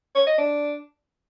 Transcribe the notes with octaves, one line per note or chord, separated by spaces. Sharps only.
C#5
D#5
D4